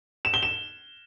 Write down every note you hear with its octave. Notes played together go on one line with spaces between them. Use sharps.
E7
G7
E7